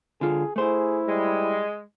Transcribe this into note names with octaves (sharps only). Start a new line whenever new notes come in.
D3 F4 G#4
A3 E4 G#4 C5
G3 G#3